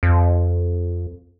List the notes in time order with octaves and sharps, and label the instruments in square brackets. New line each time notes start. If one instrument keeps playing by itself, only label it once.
[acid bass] F2